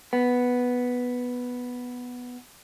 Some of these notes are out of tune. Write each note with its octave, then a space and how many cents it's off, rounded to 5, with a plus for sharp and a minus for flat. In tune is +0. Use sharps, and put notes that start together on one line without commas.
B3 +0